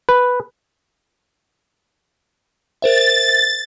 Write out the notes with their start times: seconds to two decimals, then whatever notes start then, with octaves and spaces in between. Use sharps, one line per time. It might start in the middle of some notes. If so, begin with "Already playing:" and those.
0.09 B4
2.82 A#4 C5 E5 A6